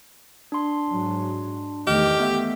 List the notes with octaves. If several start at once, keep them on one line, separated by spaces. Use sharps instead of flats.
D4 C6
G#2 F#3
E2 D#3 A3 G4 D#5 F6
B3 E5